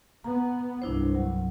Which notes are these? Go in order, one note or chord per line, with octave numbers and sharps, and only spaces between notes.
B3 A#5
C2 G2 D4 E4 C5
F#3